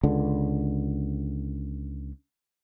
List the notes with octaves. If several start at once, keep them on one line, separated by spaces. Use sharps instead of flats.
C#2 D3